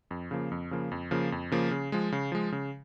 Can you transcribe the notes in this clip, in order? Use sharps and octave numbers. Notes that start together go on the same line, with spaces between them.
F2
C#3 F3 A#3
F2
C#3 F3 A#3
F2
C#3 F3 A#3
F2
C#3 F3 A#3
C#3
F3 G#3
C#3
F3 G#3
C#3